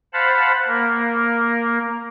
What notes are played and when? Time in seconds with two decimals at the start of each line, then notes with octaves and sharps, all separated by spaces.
0.13 C5 F5 F#5 A5 B5
0.68 A#3 A#4